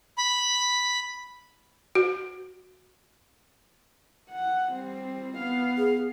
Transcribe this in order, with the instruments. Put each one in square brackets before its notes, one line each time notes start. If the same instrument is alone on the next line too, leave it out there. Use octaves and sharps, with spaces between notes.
[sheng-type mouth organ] B5
[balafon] F#4
[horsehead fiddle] F#5
G3 C4
B3 F5
[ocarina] G#4